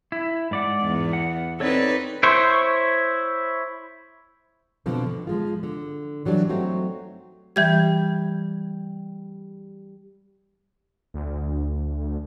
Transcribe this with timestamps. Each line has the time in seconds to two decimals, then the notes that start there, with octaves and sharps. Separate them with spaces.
0.12 E4
0.51 G#2 D5 F#5
0.82 E2
1.13 F#5
1.60 C4 D#4 A4 B4 C#5 D5
2.23 E4 C5 C#5
4.86 B2 D3 F3 C4
5.06 D3
5.27 F3 G#3 F4
5.63 D3
6.25 E3 F#3 G3 D4
6.49 F#3 A3 C4 D#4 F#4
7.56 E3 G3 G6 G#6
11.14 D2